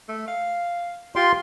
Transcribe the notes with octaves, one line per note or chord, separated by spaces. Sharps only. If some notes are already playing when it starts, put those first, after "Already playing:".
A3
F5
F4 G4 C6